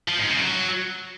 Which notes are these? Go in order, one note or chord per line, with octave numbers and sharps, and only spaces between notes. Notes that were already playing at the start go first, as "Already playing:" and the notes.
F3
G#2
C#3
F#3